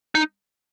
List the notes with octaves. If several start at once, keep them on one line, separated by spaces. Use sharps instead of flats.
D#4